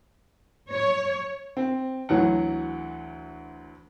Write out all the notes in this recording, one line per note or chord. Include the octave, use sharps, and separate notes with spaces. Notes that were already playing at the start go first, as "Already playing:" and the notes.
C#5
C4
D2 E3 F#3 F#5